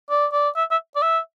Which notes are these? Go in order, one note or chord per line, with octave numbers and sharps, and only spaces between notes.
D5
D5
E5
E5
D5
E5